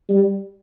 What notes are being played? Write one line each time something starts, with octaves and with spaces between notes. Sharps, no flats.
G3